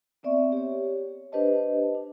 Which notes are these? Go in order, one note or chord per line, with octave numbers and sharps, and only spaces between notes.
B3 C4 D5 E5 C#6
G4 C#5
D4 G4 B4 C5 D#5 A5
D4